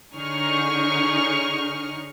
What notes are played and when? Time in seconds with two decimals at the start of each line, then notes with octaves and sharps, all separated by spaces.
0.13 D3 D#4 G#4 C#5 C#6 F6